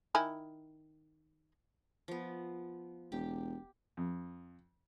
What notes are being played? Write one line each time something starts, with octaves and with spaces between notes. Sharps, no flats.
D#3 E4 G#5
F3 B3
E1 G4
F2